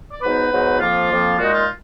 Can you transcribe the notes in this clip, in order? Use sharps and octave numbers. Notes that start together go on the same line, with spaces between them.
D5
G#2 F#3 B3 D#4 B4
G#2 F#3 B3 D#4
F2 F3 A#3 F4
F2 F3 A#3
A#2 G#3 D#4 F#4
F4